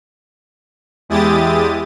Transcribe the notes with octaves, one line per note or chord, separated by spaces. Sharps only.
E2 G#3 E4 G4 D#6 A6